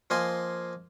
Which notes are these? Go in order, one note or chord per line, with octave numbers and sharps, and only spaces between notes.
F3 A#3 D#5 G#5 C6